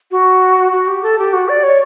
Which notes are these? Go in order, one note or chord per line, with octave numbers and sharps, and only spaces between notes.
F#4
F#4
G4
A4
G4
F#4
D5
C#5